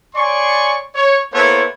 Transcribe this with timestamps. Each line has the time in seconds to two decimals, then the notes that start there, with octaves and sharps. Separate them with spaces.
0.15 C#5 D5 G#5 C6 C#6
0.95 C#5
1.33 A#3 B3 E4 A4 C5 C#5